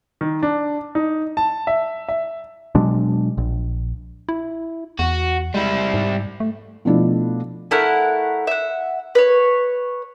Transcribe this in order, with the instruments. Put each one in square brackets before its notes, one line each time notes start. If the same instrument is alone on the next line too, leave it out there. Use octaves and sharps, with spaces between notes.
[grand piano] D#3
D4
D#4
A5
E5
E5
[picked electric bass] B2 F#3 G#3 D4
A#1
[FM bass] E4
[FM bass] E2 [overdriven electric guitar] F#4
[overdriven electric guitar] G3 E4 [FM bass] G#3
[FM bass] G#2
A3
[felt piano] B2 F3 A3 D4 E4
[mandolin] A3 E4 A#4 F#5
E5 F#5
B4 C#5